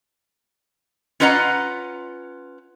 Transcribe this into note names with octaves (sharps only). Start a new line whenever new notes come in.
C#4 F4 B4 D#5 F#5 A#5